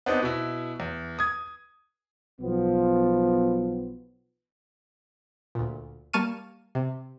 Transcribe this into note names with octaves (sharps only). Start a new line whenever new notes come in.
B3 C4 D4 D#4
B2 E4
E2
D#6 G#6
B1 F3 B3
D2 A#2
G3 A#3 A5 C#6 F6 D#7
C3